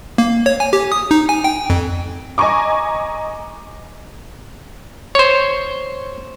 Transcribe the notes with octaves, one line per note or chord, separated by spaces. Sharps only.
A#3
C#5
G#5
G4
D#6
D#4
G#5
G5
F2
D#5 G#5 A#5 C#6 D6
C5 C#5